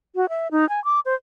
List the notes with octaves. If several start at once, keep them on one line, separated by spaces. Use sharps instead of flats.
F#4
E5
D#4
G#5
D6
C5